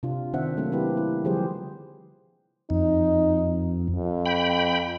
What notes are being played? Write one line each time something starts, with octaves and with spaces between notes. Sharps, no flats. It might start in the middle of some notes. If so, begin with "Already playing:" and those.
C3 D4 F4
D#3 C4 D4 C5 E5 F#5
F#3 A3 A#3 C4 D4
C4 E4 G4 B4
E4
D3 F3 G3 G4 G#4 C5
F2 D#4
F2
G5 B5